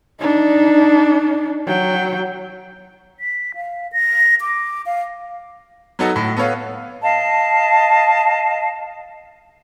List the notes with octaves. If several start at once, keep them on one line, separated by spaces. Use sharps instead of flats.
D4 D#4
F#3 G5
B6
F5
A#6
D6
F5
F#3 B3 D#4 F#4 A4
A2
B3 A4 B4 C#5 F5
D#5 F5 A5